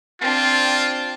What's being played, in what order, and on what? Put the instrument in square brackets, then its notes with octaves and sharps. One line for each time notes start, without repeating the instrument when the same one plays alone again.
[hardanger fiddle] C4 D4 [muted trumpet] F4